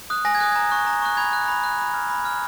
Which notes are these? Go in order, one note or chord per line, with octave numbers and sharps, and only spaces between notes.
D#6 F#6
G#5 A#6
G#6
D#6 F#6
A#5 G#6
C#6 F#6
A#5
C#6 F#6
B5 G#6
F#6
B5
F#6
B5
F6
B5
F6